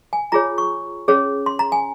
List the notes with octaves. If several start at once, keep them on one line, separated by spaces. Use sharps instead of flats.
G#5
F4 G#4 C#5 A#5
C#6
C#4 G#4 C#5
C6
A#5
G#5